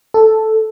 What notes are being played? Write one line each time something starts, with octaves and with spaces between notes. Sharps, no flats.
A4